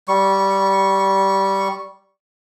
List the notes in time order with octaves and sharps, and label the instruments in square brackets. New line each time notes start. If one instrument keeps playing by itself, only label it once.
[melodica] G3 C#6